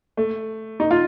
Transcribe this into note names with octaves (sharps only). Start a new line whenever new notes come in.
A3
D#4
F4